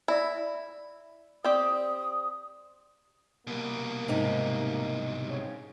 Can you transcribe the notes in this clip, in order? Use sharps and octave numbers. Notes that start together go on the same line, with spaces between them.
E4 D5 E5 E6
C4 G4 D5 D#6
C2 B2 A#3
G#2 C3 D#4
C#3 C4 C#5